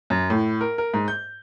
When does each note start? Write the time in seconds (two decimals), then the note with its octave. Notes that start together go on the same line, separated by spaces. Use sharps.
0.10 F#2
0.30 A2
0.61 A#4
0.78 A#4
0.94 G#2
1.08 G6